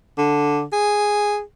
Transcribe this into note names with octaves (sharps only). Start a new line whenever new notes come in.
D3
G#4